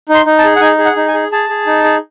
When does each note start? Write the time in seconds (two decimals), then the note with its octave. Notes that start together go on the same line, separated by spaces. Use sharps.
0.09 D#4
0.14 C6
0.26 D#4
0.38 A5
0.44 G#4
0.56 F#5
0.61 D#4 G#5
0.78 G#4
0.85 F#5
0.96 D#4
1.08 G#5
1.14 G#4
1.32 G#4 A5
1.49 G#4
1.67 D#4
1.84 G#4